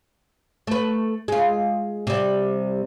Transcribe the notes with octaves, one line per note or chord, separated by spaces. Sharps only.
A3 B4
G#3 F4
C3 G3